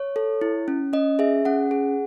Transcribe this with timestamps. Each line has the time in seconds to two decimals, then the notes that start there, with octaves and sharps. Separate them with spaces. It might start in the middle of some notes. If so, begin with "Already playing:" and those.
Already playing: C#5
0.16 A4
0.41 E4
0.68 C#4
0.93 C#4 D#5
1.19 G#4 E5
1.45 C#4 F#5
1.71 G#4